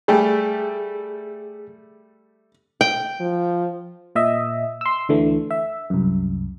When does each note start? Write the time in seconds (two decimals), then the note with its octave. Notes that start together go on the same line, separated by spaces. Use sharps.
0.08 G3 A3 G4 G#4
2.81 G5
3.20 F3
4.15 A#2 D#5 E5
4.81 C6 E6
5.09 D2 D3 E3 A3
5.51 E5
5.90 C2 F#2